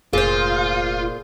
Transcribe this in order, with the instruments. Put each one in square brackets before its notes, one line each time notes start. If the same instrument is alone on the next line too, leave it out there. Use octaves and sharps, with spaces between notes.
[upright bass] F1 [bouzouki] A#2 C5 [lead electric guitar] F4 [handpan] G#4